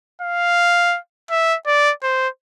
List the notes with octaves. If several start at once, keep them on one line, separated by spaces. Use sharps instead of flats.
F5
E5
D5
C5